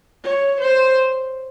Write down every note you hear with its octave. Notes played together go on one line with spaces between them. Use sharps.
C#5
C5